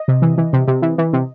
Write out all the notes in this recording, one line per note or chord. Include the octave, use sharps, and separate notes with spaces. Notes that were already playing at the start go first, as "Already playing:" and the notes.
Already playing: D#5
C3
E3
E3
C3
C3
E3
E3
C3